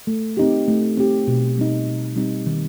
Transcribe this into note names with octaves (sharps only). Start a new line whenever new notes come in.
A3
C4 D#4 G4
A3
C4 D#4 G4
B2
G3 C4 D#4
B2
G3 C4 D#4
D#3